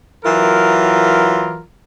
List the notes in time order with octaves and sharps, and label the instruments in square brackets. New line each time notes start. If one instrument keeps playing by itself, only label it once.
[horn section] E3 F#3 F4 A#4